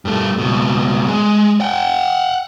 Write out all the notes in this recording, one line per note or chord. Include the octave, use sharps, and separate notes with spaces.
G2 A3
C#2 B2
G#3
F#5 G5